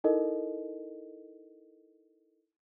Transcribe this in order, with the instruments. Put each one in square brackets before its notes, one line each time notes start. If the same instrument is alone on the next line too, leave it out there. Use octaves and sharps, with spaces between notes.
[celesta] D#4 E4 A4 A#4 D#5